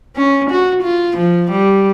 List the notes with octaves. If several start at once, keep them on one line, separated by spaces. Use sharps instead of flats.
C#4
F#4
F4
F3
G3